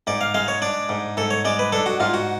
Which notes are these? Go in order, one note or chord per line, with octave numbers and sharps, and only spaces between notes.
G#2 D5
F5
G#3 F5
C#5
D4 D5
G#2
G#2 A4
C#5
G#3 D5
B4
D4 A4
F#4
G#2 F4
F#4